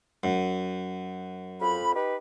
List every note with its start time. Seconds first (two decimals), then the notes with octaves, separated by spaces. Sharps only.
0.24 F#2
1.61 F2 B5
1.95 D#4 G4 B4